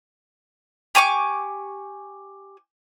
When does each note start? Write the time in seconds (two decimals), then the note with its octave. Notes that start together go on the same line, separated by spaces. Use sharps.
0.95 G4 G#5 C#6 D6